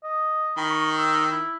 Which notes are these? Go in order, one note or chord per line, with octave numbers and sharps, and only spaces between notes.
D#5
D#3 B5
C#6
E6
E4